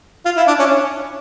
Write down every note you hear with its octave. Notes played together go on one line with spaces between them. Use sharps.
F4
E4
D4
C#4